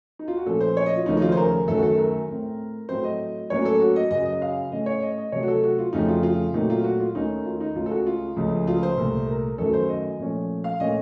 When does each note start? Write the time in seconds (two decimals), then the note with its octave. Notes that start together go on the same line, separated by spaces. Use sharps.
0.19 D#4
0.28 F4
0.37 F#4
0.46 A#2 F3 A3 C#4 A4
0.60 C5
0.77 C#5
0.86 D#5
0.96 F4
1.06 D#2 C#3 F3 A3 C#4 D#4
1.17 D#4
1.22 F4
1.32 C5
1.37 A#4
1.68 F#2 D#3 A3 A4
1.78 F#4
1.83 A4
1.98 A#4
2.28 A2 A3 C4
2.89 A2 F#3 A3 C4 C5
3.04 D#5
3.50 A2 F#3 A#3 C#4 C#5
3.65 A4
3.80 F#4
3.96 D#5
4.10 F#2 C#3 F#3 D#5
4.26 D#5
4.42 F5
4.71 A2 A3 C#4 D#5
4.86 C#5
5.02 D#5
5.18 D#5
5.32 C3 F#3 A3 C#5
5.43 F#4
5.48 A4
5.63 F#4
5.78 F4
5.93 F2 C#3 A3 C4 D#4
6.08 F4
6.23 F4
6.54 A#2 F#3 A3 C4 D#4
6.70 F4
6.84 F#4
7.00 F4
7.15 D#2 D#3 A3 C#4 D#4
7.46 F4
7.61 D#4
7.75 C#2 C#3 A3 F4
7.86 A4
7.91 F#4
8.07 F4
8.36 C#2 C#3 F3 A3
8.67 F4
8.83 C5
8.98 C2 A#2 A3
9.28 A#4
9.58 F#2 D#3 F#3 A3 C#4 A4
9.73 C5
9.89 D#5
10.19 A#2 F3 A3 C#4
10.64 F5
10.80 A#2 A3 C#4 D#5